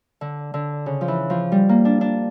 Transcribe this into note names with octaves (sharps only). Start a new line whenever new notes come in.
D3
D3
C#3
F3
E3
F3
G3
A#3
D4
D4